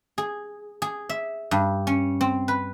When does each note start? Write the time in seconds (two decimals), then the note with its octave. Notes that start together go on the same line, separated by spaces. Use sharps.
0.18 G#4
0.82 G#4
1.09 E5
1.51 G2
1.87 C#4
2.21 C4
2.48 B4